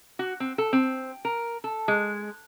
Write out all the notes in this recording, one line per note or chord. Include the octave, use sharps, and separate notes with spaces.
F#4
C4
A4
C4
A#4
A4
G#3